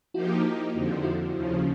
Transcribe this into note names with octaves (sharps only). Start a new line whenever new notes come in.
F3 A#3 D#4 E4 F#4 G4
F2 D3 F3
E4 F#4
D#2 C#3 F3